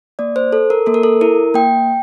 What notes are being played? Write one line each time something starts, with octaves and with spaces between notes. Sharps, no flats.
A#3 D5
C5
A4
A#4
A#3 A4
A#4
A4
E4 A#4
A#3 G5